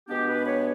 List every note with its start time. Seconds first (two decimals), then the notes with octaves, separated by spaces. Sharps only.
0.07 B2 G#3 B3 D4 G4
0.26 B4
0.45 C#5